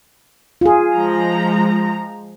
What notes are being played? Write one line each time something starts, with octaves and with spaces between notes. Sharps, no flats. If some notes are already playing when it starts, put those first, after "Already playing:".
F4 G#4
F3 G#3 A#5